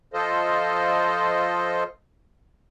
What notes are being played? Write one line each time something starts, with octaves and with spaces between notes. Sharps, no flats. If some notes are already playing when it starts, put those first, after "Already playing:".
F3 F4 A4 C5 D#5